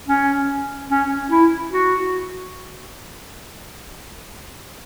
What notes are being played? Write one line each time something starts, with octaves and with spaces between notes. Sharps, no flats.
C#4
C#4
E4
F#4